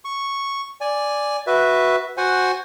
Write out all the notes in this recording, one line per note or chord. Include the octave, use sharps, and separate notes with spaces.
C#6
D5 G#5
F#4 B4 E5
F#4 C5 F#5 G#5